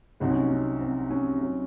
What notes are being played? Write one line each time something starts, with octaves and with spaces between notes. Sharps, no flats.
C2 C3 F#3 C4 D#4 F#4
C#4
D#4
C#4
C4
C#4
F#3 C#4